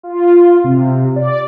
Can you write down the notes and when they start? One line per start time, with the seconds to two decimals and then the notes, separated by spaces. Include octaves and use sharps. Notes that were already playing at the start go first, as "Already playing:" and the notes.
0.03 F4
0.64 C3
1.16 D5